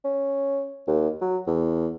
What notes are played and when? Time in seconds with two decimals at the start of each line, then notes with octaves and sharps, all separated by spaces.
0.04 C#4
0.87 D#2
1.21 F#3
1.47 E2